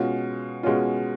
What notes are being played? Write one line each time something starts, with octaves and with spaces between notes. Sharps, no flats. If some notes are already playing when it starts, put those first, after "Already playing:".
Already playing: B2 G#3 C#4 F4
B2 G#3 C#4 F4